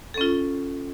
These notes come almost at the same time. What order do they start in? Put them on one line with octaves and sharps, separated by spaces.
A4 C#4 F4